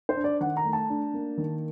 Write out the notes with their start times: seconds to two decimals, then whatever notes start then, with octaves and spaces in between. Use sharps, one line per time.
0.09 C5
0.17 D4
0.24 D5
0.41 D#3 F#5
0.57 A#5
0.64 A3
0.73 A5
0.89 D4
1.14 A#3
1.38 D#3